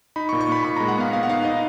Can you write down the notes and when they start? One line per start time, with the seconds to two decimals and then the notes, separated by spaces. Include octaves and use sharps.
0.16 D#4 B5
0.29 C#6
0.32 A#2
0.41 C#6
0.48 A#2 B5
0.64 A#2 B5
0.76 A#5
0.80 G#3
0.88 F#5
0.97 B3 F5
1.12 B3 F5
1.23 F#5
1.29 D#4 F5
1.45 D#4 D#5